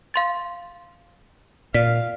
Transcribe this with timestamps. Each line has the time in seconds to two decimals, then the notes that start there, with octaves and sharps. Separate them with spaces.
0.14 F5 C6 A6
1.74 A#2 D5 F5 B6